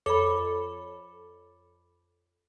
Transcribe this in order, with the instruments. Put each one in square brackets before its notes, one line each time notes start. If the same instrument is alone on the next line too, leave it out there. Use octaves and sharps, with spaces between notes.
[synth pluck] F2 A4 C#5 [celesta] B5 D6